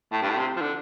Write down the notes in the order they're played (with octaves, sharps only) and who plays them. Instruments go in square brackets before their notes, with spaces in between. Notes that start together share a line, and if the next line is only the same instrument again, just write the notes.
[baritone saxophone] A2
G2
A2
C3
F3
D3